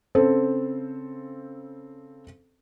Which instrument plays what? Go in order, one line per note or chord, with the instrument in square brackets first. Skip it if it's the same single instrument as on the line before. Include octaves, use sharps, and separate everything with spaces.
[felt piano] C#3 C4 A4 C5